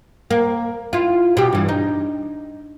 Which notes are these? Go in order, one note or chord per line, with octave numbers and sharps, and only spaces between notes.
A#3
E4 F4
B2 G4
G2 E3
D#4